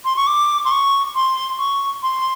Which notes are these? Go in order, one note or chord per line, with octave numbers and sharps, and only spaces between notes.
C6
C#6
D6
C6
C#6
C6
C#6
C6